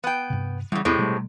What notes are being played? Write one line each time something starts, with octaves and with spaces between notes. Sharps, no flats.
B3 G5
G2 C3
E2 C#3 G3
E2 A2 C3 G#3 B3 C4
B2 G3 A3